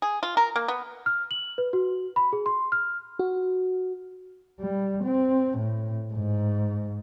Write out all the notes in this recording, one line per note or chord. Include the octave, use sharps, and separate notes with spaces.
G#4
F4
A#4
A#3
B3
F6
F#7
B4
F#4
B5
G#4
C6
F6
F#4
G3
C4
A2
G#2